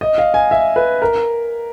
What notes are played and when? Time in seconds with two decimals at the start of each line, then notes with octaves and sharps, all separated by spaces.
0.01 D#5
0.18 F5
0.34 G#5
0.51 E5
0.76 B4
1.02 A#4